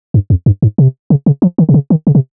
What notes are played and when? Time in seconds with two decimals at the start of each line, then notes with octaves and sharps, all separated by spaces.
0.14 G2
0.30 F2
0.46 G2
0.62 G#2
0.78 C3
1.10 C#3
1.26 C#3
1.42 F3
1.58 D#3
1.69 C3
1.74 C#3
1.90 D#3
2.07 C#3
2.15 C3